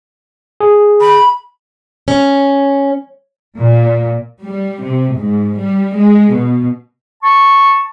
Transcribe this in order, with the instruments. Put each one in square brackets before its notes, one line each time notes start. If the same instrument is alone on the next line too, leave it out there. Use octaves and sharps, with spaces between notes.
[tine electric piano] G#4
[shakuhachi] B5
[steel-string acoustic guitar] C#4
[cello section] A#2
G3
C3
G#2
G3
G#3
B2
[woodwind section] A5 C#6